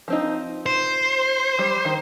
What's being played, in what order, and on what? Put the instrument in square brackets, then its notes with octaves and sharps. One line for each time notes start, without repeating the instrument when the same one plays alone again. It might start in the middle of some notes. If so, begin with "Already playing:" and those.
[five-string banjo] F3 C4 D#4
[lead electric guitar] C5
[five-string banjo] G3
D#3